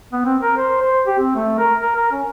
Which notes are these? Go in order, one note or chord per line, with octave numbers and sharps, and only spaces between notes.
B3
C4
A#4
C5
C5
G4
C4
A3
A#4
A#4
A#4
C#4